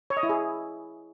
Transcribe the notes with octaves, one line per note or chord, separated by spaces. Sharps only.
C#5
D#5
E4
G#4